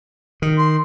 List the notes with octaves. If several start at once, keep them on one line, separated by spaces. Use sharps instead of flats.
D#3
C6